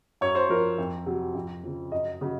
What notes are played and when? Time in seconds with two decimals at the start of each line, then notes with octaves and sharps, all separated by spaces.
0.21 F#2 C#5
0.35 C5
0.49 F3 A#4
0.78 F2
1.06 C3 F#3
1.35 F2
1.63 C#3 F3
1.92 F#2 D#5
2.21 C#3 F#3